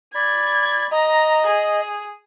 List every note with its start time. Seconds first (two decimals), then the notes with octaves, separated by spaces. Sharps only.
0.15 D5 B5 G#6
0.92 D#5 A#5
1.47 G#4